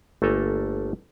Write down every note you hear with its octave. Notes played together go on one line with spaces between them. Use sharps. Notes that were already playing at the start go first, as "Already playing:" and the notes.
G1 A3 A#3 A4 G#5 A#5